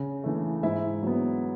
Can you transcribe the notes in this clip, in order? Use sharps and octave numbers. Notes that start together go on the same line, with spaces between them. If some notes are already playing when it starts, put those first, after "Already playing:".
Already playing: C#3
E3 A3
G#2 E4 E5
F#3 B3